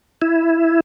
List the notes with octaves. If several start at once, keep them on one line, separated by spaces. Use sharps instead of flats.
E4